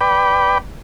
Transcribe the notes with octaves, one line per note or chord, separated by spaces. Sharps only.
B4 D5 G5